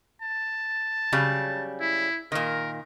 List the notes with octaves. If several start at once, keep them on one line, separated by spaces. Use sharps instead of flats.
A5
C#3 F#3 G3
E4
A#2 D#3 A#4